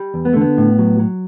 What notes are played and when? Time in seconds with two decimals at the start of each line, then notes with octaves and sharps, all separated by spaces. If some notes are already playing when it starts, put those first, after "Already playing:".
Already playing: G3
0.14 E2
0.25 B3
0.33 D3 A3
0.41 B3
0.58 A2
0.79 F#3
0.99 F#3